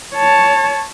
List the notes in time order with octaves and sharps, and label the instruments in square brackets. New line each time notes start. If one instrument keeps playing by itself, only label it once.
[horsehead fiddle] C#5 A5